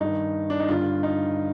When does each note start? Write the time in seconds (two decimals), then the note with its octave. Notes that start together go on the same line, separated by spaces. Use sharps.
0.01 G2 D#3 D#4
0.50 D4
0.60 D#4
0.68 G2 D3 F4
1.03 D#4